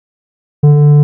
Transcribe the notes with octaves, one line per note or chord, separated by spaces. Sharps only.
D3